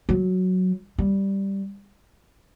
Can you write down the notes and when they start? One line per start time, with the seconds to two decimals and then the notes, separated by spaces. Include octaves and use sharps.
0.09 F#3
0.98 G3